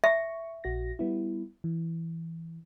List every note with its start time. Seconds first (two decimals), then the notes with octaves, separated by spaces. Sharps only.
0.04 E5 C#6
0.64 A#1 F#4 A#6
0.99 G3 B3 E4
1.64 E3